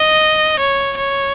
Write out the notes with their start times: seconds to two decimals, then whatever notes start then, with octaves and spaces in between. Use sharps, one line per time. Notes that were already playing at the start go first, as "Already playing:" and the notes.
Already playing: D#5
0.59 C#5
0.97 C#5